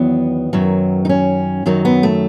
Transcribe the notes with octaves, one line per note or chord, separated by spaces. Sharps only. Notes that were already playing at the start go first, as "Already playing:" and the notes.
Already playing: E2 D#3 F#3 B3
F#2 D#3 F#3
D#4
C#4
F#2 D#3 F#3 D#4
B3
A3